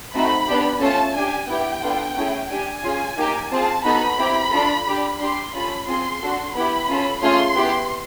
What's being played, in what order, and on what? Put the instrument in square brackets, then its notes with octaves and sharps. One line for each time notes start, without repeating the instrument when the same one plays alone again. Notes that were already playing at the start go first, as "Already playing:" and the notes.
[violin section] A3 C4 D#4 F#4 B5
B3 D4 G4
A3 C#4 F4 A4 A5
D4 G4 G#5
B3 E4 G4 G5
B3 D4 F4 A4
A3 C#4 E4 G#4
D4 G4 G#5
C#4 F4 G#4
A#3 D#4 G4
C4 F4 G#4 A5
B3 D#4 F#4 A4 B5
C4 E4 G4
D4 F4 A4
D4 G4
D4 G4 C6
C#4 F4 A4 B5
C4 F4 G#4 C6
D4 F#4 A4
B3 E4 G4 B5
C#4 F4 A4
A3 C#4 F4 G#4 C6
B3 E4 G4